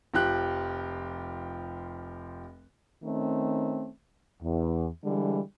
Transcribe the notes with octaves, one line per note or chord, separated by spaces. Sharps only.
F1 F3 G4 F#6
D#3 A3 C4 C#4
E2
D3 E3 G3 G#3